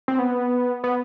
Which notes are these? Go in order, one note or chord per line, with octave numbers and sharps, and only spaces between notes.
C4
B3
B3